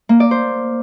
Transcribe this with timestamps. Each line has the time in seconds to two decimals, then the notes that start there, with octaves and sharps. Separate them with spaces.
0.09 A#3
0.20 D5
0.31 C5